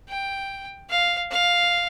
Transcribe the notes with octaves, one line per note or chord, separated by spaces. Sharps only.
G5
F5
F5